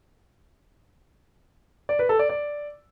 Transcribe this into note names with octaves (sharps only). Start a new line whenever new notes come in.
D5
B4
A4
D5
D5